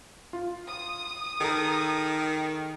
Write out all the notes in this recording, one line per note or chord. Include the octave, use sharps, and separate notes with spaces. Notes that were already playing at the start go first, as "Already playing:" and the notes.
F4
D#6
D#3 G#4 A4 A#5